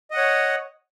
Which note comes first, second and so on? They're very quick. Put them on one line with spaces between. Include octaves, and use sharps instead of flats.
D#5 F#5 C#5